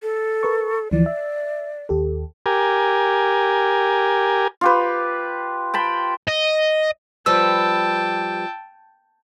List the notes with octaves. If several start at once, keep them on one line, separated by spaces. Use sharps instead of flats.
A4
A#4 B4 C#6
D2 E3 F3 D5
E5
D#2 G4 A4
G4 A#4 G#5
F4 G4 B4
G5 A5 B5
D#5
F3 G3 B4 G5 A5 E6